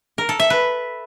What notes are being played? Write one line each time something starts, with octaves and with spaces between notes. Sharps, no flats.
A#4
A4
E5
B4